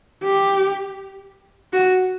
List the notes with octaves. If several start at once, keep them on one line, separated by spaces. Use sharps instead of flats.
G4
F#4